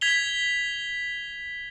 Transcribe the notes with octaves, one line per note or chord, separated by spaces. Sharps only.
G#6 B6 F7 G7